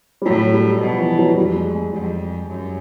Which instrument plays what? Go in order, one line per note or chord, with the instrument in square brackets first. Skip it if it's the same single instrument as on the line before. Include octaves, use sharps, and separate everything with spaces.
[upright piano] G3
[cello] A2 [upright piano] F#3
[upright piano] G3
G3
[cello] B2
[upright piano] F3
E3
F#3
[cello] F2 [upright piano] G3
[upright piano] G#3
G#3
[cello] F2 [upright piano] G3
[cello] F#2